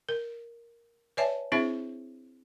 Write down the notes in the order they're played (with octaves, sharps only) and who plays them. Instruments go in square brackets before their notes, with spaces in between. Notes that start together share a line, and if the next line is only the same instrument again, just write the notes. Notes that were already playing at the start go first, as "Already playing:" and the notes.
[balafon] A#4
B4 C#5 D5 E5 G#5 A5
C4 D4 E4 G#4 C5 E5